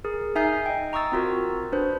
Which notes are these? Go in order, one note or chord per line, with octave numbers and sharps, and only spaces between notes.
G#4 A#4
D#4 E5 G#5 D#6 G6 C7
D#5 G5
A#5 C#6 D#6 E6 A6
C4 F4 F#4 A#4
D4 B4 C5